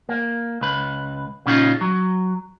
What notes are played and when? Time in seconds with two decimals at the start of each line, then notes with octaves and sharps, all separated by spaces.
0.09 A#3
0.61 C#2 B4
1.46 A#2 C#3 C#4 D#4 F4
1.81 F#3